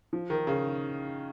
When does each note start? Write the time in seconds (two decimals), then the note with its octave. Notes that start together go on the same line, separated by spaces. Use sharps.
0.13 F3
0.30 D#3
0.47 C#3